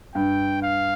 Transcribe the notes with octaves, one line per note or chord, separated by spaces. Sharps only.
G2 G5
F5